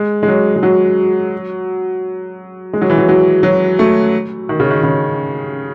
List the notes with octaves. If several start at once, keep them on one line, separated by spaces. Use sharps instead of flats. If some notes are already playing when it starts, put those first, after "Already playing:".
Already playing: G#3
G#3
F#3
G#3
F#3
G#3
F#3
E3
F#3
F#3
F#3
A3
D#3
C#3
D#3
C#3